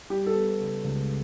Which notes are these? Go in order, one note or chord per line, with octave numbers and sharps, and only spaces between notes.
G3 G4
A4
B3
C#3
C#2